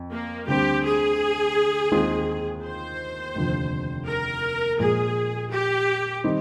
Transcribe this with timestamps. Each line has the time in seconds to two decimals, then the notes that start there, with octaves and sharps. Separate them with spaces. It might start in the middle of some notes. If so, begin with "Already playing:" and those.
Already playing: F2
0.11 A#3
0.47 D2 D3 G3 C4 G4
0.83 G#4
1.92 D#2 D#3 G#3 C4 F4
2.64 C5
3.35 F1 D#2 D3 F3
4.07 A#4
4.79 A#2 F3 G#3 G#4
5.51 G4
6.24 D#3 G3 C4 D#4